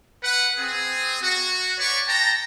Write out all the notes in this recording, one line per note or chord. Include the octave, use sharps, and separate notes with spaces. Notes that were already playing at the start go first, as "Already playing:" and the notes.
B4 F#5
C4 G#4
F#4
B4 C#5 D5 C#6
G5 A5 A#5